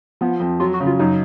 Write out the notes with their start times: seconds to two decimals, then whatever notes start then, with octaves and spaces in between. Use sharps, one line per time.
0.21 F3 B3
0.40 F2
0.60 F#3 F4
0.74 F#4
0.80 C#3
0.87 F4
0.99 F#2 D#4